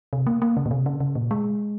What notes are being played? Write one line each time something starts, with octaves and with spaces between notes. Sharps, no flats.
C3
A#3
A#3
C#3
A#2
C3
C#3
C#3
A#2
G#3